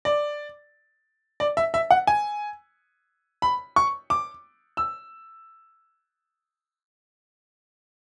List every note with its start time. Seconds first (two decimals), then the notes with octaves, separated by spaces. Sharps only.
0.05 D5
1.40 D5
1.57 E5
1.74 E5
1.91 F#5
2.07 G#5
3.42 B5
3.76 C#6
4.10 D6
4.77 E6